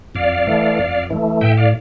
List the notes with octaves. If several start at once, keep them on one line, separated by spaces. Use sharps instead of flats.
F2 D5 F5
E3 A3
F2
E3 A3
A2 E5 G5
D5 F5